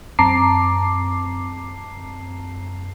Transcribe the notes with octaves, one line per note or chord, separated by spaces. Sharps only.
F#2 C4 A5 A#5 D6 C7